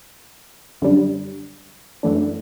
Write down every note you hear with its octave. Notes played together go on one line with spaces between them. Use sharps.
F#2 D3 G3 D4
F#2 E3 A3 D4